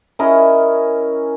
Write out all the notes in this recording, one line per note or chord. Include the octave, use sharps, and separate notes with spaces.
C#4 E4 A#4 D#5